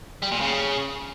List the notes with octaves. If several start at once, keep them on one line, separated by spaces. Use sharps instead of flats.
G3
A#2
C#3